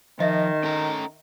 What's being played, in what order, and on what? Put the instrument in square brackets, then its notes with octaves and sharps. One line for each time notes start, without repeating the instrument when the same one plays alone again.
[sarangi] D#3 [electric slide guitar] F3 [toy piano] D#5 E5
[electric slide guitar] C#4 A4 A#5